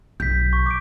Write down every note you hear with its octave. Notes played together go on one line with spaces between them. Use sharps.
B1 G6 B6
C#6
D6 D7